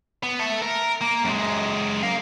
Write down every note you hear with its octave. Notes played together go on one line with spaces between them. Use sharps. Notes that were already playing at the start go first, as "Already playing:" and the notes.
B3
A4 E5
A#4
A#3
F#2 G#3
A#4 F5